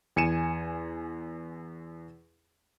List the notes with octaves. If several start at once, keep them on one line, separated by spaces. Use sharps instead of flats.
E2 G#5 C#7 D#7 E7